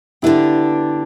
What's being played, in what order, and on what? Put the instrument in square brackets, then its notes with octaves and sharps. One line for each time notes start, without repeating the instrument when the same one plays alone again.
[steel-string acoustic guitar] D3 B3 D4 G4 [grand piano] E4